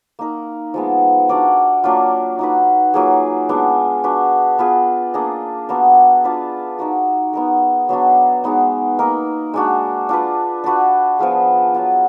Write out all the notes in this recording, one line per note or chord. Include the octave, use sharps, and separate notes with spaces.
A#3 D#4 A#4
F3 G#3 B3
D4 F#4 A#4 D5
F#3 A#3 D4 F4
D#4 F#4 B4
F#3 A#3 F4 G#4
G#3 B3 D4
D4 F#4 B4
B3 F4 G#4 B4
A#3 D4 G#4 D#5
B3 D4 F#4 A#4
D4 F4 B4 F5
D#4 F#4 A#4
B3 D#4 A#4
F#3 B3 D4 F#4
G#3 B3 D#4
A#3 D#4 A#4
G#3 D4 F#4
D4 F4 B4
D4 F#4 B4
F3 B3 F4 G#4
F#3 B3 F4